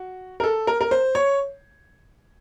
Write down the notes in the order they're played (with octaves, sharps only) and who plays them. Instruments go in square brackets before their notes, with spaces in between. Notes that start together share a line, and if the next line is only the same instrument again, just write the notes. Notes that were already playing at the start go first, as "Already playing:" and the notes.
Already playing: [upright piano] F#4
A#4
A4
A#4
A#4
C5
C#5